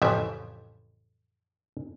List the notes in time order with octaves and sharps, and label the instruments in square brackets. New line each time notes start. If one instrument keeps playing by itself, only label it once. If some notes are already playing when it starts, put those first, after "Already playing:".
[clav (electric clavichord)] A1 F2 C#3 E3 F3 E5